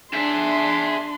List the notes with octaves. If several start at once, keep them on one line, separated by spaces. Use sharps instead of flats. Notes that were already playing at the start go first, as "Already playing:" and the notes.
D4 G#4 E5 C6